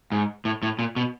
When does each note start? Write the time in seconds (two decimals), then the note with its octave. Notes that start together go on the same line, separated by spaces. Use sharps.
0.12 G#2
0.45 A2
0.63 A2
0.79 A#2
0.96 B2